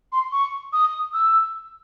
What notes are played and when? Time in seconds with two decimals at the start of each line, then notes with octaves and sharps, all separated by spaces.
0.12 C6
0.32 C#6
0.73 D#6
1.14 E6